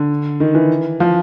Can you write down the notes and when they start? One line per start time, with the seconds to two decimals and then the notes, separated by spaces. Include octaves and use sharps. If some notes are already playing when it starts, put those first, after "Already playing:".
Already playing: D3
0.40 D#3
0.55 E3
1.00 F3